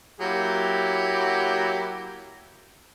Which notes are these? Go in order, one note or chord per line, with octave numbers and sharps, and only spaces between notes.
F#3 A#3 E4 G4